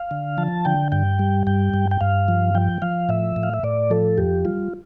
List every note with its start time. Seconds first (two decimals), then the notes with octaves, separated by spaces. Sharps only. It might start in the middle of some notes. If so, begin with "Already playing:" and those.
Already playing: F5
0.11 D3
0.38 F3 A5
0.65 D3 G5
0.92 G2 G5
1.19 G3
1.47 G2 G5
1.74 G2
1.91 G5
2.01 G2 F5
2.28 F3
2.55 F3 G5
2.82 F3 F5
3.09 A2 E5
3.36 A2
3.43 F5
3.54 E5
3.63 A2 D5
3.90 F3 A4
4.18 F2 G4
4.45 G3 F4